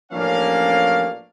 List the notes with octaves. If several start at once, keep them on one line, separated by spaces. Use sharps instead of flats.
A1 F3 A#3 C#4 D4 F5